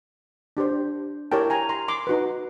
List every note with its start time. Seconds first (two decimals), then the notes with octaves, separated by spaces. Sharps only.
0.57 D4 G4 C5
1.31 E4 G4 A#4 C#5 G5 A5
1.50 G#5 A#5
1.69 A#5 C6
1.88 C6 D6
2.07 D#4 F#4 B4